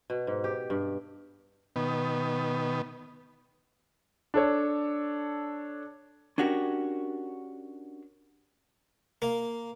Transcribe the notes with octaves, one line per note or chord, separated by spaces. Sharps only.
B2
G#2
G4
G2
B2 D#3 B3
D4 A4 C#5
C#4 D4 F#4 G4 A#4
A#3